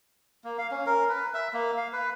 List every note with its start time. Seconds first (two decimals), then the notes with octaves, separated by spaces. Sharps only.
0.44 A#3
0.58 F5
0.71 C#4
0.86 A#4
1.09 B4
1.34 E5
1.53 A#3
1.77 F5
1.93 B4